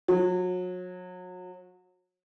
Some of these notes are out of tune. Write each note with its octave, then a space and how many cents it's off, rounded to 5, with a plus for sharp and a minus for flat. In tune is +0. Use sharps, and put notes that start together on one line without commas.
F#3 -30